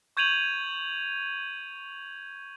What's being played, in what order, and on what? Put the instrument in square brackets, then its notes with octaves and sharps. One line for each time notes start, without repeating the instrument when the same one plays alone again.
[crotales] C#6 G6 G#6 D#7 F7 F#7